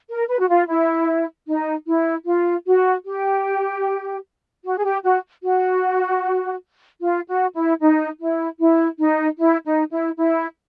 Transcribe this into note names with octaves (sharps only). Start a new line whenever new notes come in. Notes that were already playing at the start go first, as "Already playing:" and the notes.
A#4
B4
F#4
F4
E4
D#4
E4
F4
F#4
G4
F#4
G#4
G4
F#4
F#4
F4
F#4
E4
D#4
E4
E4
D#4
E4
D#4
E4
E4